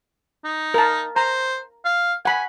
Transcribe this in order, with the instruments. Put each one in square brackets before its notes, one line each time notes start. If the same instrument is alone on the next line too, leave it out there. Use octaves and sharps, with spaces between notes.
[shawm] D#4
[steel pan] A#4 A5
[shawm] C5 [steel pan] A#5
[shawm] F5
[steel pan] F#5 B5 [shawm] G#5